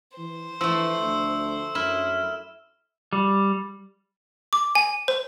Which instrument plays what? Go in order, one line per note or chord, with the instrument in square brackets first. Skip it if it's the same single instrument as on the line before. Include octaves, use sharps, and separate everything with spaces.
[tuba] E3 [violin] C5
[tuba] E3 [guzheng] F3 A3 [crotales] E6
[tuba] D2
[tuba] F#2 [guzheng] E4 [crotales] F6 E7
[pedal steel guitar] G3
[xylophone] D6
G#5
C5